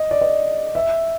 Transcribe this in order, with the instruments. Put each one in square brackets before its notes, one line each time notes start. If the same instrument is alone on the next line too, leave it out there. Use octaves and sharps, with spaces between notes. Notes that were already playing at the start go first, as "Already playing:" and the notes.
Already playing: [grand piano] D#5
D5
D#5
E5